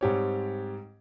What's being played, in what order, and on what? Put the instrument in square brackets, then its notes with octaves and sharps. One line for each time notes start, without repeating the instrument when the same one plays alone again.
[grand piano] G#2 G3 C4 G4 C#5